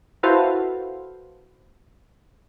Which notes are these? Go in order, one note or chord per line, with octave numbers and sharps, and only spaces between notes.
E4 F#4 A4 B4 C5 F5